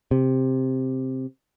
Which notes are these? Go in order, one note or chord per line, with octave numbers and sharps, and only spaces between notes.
C3